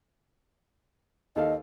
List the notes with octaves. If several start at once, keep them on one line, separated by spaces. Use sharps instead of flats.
D#2 A4 D#5 F5